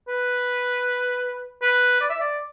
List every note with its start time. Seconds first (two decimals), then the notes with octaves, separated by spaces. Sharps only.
0.08 B4
1.62 B4
2.01 D5
2.10 E5
2.20 D5